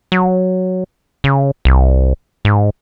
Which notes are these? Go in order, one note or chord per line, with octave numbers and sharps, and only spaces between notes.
F#3
C#3
C2
G#2